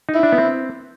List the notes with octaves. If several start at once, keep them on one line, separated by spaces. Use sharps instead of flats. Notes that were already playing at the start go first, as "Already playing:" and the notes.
D#4
E4
D4
B3
C4